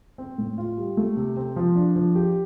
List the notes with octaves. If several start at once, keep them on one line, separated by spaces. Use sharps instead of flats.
C4
A2
F4
G3
A3
C3
C4
F3
D4
F3
G4